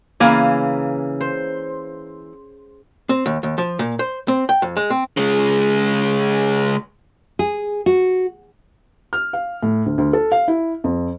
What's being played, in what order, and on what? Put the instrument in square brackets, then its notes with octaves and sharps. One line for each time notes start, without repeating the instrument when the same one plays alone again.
[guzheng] C#3 G#5 [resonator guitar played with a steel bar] E3 A#3 F5
[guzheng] C5
[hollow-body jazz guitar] C4
D#2
D#2
F3
A#2
C5
C4
G5
F2
G#3
C4
[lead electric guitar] C#3 G#3
[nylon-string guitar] G#4
F#4
[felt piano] F6
F5
A2
D2
D2
A4
F5
E4
F2